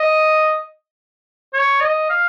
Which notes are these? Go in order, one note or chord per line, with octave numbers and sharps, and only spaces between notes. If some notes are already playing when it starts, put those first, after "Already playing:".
Already playing: D#5
C#5
D#5
F5